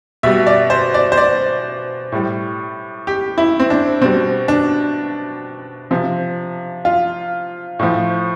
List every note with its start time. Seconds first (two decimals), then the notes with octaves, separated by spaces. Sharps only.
0.23 B2 G3 E5
0.47 D5
0.70 C5
0.94 D5
1.12 C5
1.18 D5
2.12 A2 G3
3.07 G4
3.38 E4
3.60 C4
3.70 D4
4.01 B2 G3 C4
4.48 D4
5.91 C3 F3
6.85 F4
7.79 A2 F3